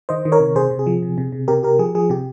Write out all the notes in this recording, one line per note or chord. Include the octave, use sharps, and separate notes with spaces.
D#3 C5 D#5
D#3
A#4 C#5
C3
C3 G#4 C5
C3
G#4
F3
C3
C3
C3
C3 G4 A#4
C3 G4 A#4
F3 G#4
F3 G#4
C3 G4